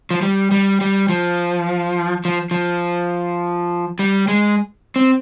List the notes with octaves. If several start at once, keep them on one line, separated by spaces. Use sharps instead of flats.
F3
G3
G3
G3
F3
F3
F3
G3
G#3
C4